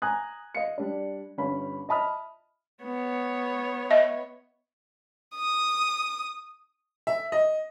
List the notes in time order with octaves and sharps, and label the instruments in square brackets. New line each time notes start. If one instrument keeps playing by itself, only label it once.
[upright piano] G#5 A#5 D#6 F#6 G#6
D#5 F5 C#7
G3 D4
G1 C#4 B5
D#5 E5 A5 B5 D#6 F6
[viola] B3 C#5
[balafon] D#5 E5
[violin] D#6
[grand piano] E5
D#5